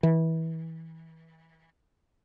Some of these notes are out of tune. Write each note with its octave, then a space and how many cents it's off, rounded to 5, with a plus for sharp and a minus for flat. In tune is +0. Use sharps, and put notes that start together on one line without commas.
E3 -25